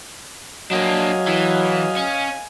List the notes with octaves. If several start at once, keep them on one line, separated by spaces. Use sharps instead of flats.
F#3 A#3 D4 D#5 F5 G#5
E3
C#4